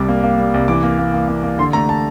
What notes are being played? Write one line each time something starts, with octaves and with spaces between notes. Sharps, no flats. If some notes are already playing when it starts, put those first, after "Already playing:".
Already playing: C2 G3 D6
A#3
A#3
G3
C2
E3 D6
A#3
A#3
A#3
A#3
A#3
D3 C6
A3 A#5
A5